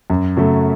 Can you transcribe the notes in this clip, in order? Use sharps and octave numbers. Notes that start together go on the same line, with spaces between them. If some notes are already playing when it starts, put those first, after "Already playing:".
F#2
C#3 F#3 A3